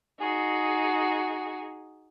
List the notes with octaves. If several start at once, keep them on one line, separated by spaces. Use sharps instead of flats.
D#4 F#4 G#4